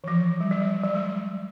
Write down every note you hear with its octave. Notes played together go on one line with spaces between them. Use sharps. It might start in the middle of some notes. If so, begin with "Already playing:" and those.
E3
F3
G3
F#3
G3
F#3
G#3